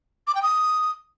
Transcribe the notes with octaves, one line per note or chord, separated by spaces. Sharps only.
D6
G5
D#6